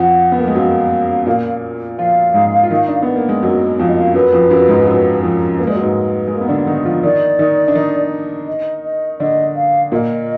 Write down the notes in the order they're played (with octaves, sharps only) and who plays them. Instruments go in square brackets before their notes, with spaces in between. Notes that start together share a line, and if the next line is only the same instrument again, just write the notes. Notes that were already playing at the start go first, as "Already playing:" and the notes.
Already playing: [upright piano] F2 F3 [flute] F#5
[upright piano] B3
A#3
G#3
[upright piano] F#2 F#3 [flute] F5
[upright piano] A#2 A#3
[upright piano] F3 F4 [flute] F5
[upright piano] G#2 G#3
F4
D#3 D#4
D4
B3
A#3
G#3
[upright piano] F#2 F#3 [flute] D#5
[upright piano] F2 F3 [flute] F5
[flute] D#5
F5
[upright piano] F#2 F#3 [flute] B4
[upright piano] F2 F3
F#2 F#3
G#2 G#3
F3
F#2 F#3
F2 F3
[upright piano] A#3 [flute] B4
[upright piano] G#3 [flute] D5
[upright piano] F#3
[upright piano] G#2 G#3 [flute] B4
[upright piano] G#3
A#3
B3
D3 D4
D#3 D#4
F3 F4
[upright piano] D#3 D#4 [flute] D5
[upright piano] D#3 D#4
D4
D#3 D#4
[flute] D#5
D#5
[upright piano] D3 D4 [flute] D#5
[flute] F5
[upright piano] A#2 A#3 [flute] D#5 F5